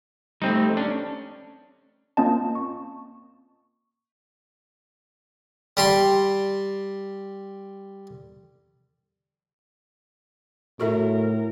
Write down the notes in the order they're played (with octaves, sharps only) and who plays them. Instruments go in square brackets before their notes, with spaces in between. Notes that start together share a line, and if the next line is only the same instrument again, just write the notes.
[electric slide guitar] G3 A3 [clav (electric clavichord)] C4 D#4
[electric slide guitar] C#4 [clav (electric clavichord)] D4
[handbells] A#3 C4 C#4 F4 D#5 A5
C#6
[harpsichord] G3 G4 C6
[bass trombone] A2 [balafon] F#4 A4 E5 [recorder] A#4